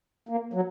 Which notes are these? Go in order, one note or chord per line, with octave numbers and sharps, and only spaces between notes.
A#3
F#3